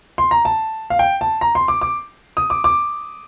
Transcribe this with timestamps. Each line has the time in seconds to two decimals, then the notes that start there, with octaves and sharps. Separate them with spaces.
0.18 C6
0.31 A#5
0.45 A5
0.90 F5
0.99 G5
1.21 A5
1.41 A#5
1.55 C6
1.68 D6
1.81 D6
2.37 D#6
2.50 D6
2.64 D6